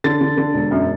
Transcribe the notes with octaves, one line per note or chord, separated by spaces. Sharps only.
D3 A6
D3
D3
E1
F#2